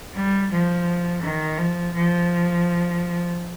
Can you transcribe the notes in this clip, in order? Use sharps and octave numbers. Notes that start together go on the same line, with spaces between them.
G3
F3
D#3
F3
F3